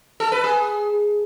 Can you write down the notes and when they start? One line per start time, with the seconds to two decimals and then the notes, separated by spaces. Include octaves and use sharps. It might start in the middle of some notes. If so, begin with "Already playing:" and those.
0.20 A4
0.32 B4
0.44 G#4